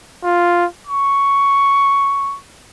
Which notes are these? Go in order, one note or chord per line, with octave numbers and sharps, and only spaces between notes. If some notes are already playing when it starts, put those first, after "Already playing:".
F4
C#6